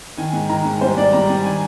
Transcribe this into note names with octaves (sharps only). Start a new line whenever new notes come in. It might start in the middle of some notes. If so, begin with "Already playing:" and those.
D#3 G#5
G#2
D#3 A#5
G#2
G3 C5
G#2 D5
G3 A#5
G3 G#5
D#3 G#5